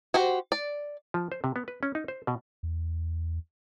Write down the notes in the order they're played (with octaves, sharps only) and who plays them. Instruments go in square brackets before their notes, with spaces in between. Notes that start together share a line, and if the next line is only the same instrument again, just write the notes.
[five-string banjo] F#4 G4 C5
D5
[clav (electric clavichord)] F3
C5
C3
B3
B4
C#4
D#4
C5
B2
[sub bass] E2